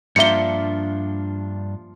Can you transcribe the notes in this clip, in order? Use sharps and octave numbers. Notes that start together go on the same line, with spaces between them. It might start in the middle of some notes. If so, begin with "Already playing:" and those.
G2 F3 A#3 D4 E5 C#7 G7